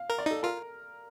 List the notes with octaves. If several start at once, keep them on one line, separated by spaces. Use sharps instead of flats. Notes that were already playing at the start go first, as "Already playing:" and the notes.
Already playing: F5
A#4
D5
D#4 A4
F4 A#4